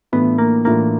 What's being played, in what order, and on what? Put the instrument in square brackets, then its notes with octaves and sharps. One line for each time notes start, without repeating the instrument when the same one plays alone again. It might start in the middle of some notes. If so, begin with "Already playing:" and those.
[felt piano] A2 E3 A3 D4 F4 [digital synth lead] B3
[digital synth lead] A#3
[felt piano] A2 E3 A3 D4 F4 [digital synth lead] A#3